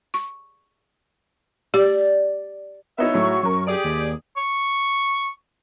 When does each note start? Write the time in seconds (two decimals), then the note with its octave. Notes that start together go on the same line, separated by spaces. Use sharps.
0.14 C#6
1.74 G4 D5
2.98 G#2 B3 D#4 E4 C#5 E5
3.14 A2 F#3 C#6
3.43 F#2 C#4 A#4
3.67 G4 G#4 D5 D#6
3.84 D#2
4.37 C#6